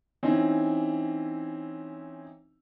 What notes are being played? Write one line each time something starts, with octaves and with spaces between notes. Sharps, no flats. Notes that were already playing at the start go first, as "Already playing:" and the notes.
E3 C4 C#4 D#4 E4